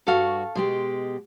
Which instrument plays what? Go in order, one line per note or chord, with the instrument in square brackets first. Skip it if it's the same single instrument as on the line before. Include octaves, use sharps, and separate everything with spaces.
[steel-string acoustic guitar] G2 F#4 [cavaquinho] A4 F5 C#6
[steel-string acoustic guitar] B2 G#3 G4 [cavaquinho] C6